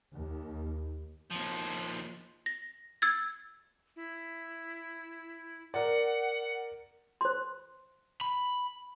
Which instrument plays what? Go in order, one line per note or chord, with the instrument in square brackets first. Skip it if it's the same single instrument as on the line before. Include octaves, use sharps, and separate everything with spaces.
[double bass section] D#2
[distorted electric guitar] D#2 F3
[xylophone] A#6
E6 G#6 A6
[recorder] E4
[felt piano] A#4 D5 [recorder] F#5
[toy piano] C5 C6
[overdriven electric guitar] B5